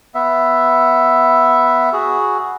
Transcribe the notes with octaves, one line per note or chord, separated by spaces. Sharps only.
B3 E5
F#4 G#4